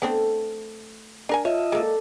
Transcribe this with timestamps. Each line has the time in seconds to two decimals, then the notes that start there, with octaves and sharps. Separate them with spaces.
0.02 A3 B3 C4 D4
1.29 D4 A#4 G#5
1.45 F4 C#5 D#5 E5 A5
1.72 G#3 A#3 A4 D5